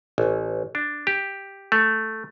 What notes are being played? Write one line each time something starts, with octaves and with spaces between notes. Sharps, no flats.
A1
D4
G4
A3